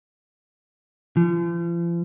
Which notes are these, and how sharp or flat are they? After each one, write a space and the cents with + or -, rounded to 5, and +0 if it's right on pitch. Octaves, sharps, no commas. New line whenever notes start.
F3 -40